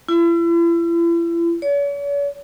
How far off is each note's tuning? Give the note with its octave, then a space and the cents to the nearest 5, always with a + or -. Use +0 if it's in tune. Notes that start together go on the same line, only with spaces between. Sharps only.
E4 +40
C#5 +45